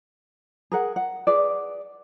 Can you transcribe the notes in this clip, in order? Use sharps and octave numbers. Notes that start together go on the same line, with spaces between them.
G#4 A#4 F#5
F#5
G#4 B4 D5